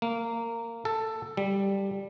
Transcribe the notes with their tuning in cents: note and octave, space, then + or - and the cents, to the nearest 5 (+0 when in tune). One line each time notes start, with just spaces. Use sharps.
A#3 -15
A4 +10
G3 +5